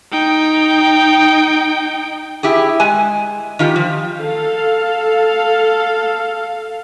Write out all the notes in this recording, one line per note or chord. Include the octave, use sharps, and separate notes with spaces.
D#4 G5
E4 G4 G#4
G#3 G#5
D#3 F4 G4
F3
A4 F5